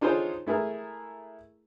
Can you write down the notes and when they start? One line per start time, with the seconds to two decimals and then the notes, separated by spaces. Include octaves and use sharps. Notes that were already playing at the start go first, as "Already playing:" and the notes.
0.01 D4 D#4 F4 G#4 C5 C#5
0.47 A3 E4 G#4 A#4